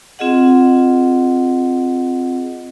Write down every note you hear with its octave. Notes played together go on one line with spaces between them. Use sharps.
C4 F4 G#4 D#5 F#5